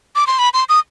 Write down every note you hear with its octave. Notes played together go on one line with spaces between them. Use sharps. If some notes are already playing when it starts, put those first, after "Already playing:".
D6
C6
B5
C6
D#6